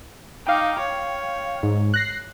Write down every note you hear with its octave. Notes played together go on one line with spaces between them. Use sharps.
D#4 F5 G5 D6
C#5
G#2
F#6 A#6 C7